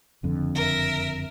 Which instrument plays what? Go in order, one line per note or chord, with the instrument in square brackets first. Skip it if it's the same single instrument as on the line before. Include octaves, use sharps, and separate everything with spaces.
[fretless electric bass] F#1 F2 D3
[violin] A#4 E5